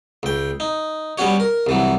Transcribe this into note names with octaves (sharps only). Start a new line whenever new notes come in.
C#2 G5
D#4
G3 B3 C#4 F#4 C#5
A#4
C2 E3 F#3